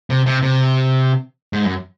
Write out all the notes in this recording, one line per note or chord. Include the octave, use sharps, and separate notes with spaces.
C3
C3
C3
G#2
F#2